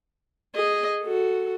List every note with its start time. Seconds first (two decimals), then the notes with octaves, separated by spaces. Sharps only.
0.55 G#4 D#5
1.03 F#4 A4